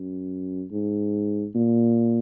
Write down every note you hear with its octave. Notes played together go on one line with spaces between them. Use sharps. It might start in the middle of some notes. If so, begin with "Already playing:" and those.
Already playing: F#2
G#2
A#2